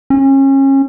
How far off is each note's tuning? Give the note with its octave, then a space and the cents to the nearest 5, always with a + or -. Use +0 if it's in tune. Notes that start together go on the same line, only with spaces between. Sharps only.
C#4 -30